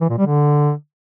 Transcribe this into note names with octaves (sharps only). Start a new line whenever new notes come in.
E3
A#2
G3
D3